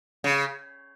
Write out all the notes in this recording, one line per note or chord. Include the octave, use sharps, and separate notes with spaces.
C#3